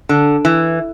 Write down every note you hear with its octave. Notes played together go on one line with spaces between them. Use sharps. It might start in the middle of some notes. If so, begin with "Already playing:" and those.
D3
E3